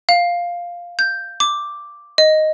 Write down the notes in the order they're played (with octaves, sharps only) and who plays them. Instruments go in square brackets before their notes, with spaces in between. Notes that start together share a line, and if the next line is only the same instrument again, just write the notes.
[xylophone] F5
G6
D6
D#5